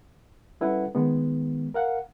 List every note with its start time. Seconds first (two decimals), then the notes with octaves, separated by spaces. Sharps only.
0.61 G3 C#4 E4 A4 B4 F#5
0.95 D#3 G#3 B3
1.74 A#4 F5 F#5